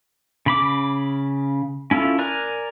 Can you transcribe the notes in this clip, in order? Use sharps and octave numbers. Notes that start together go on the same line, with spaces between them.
C#3 B5 D6
C#4 E4 F4 A4
A#4 D5 G#5 A#5 F#6